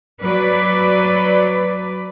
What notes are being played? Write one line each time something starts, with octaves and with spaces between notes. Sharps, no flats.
F#3 B4 D5